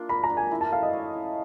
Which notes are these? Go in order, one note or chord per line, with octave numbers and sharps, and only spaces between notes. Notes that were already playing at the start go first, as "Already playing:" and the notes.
Already playing: A#3 D4 F4
A#4 B5
A#5
D4
G#5
E4
A5
A4 F5
D#5
C#5
E4